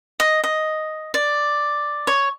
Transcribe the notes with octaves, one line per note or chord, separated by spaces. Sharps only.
D#5
D#5
D5
C#5